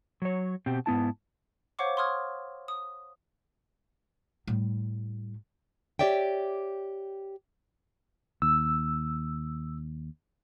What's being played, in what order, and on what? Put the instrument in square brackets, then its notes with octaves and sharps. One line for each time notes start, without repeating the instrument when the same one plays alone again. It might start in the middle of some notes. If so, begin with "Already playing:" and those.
[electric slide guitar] F#3 C#5
B2 C4 G4
G#2 B3 E4 A5
[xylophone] C5 C#5 F5 F#5 C#6 D6
C6 C#6 D#6 F6 G#6
D#6
[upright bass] A2 G3
[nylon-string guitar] G4 G#4 C#5 D5 E5 G5
[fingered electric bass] D#2 [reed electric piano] E6